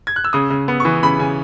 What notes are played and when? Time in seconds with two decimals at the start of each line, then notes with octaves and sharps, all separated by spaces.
0.07 G#6
0.16 F#6
0.24 E6
0.33 C#3 D#6
0.50 C#3
0.68 B3
0.80 E3 C#6
1.03 C#3 B5
1.19 C#3 G#5